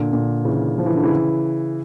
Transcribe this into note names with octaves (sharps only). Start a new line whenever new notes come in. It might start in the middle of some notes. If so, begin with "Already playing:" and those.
Already playing: A#2 D3
A#2 D3
C#3 E3
F3
E3
D3
C#3 E3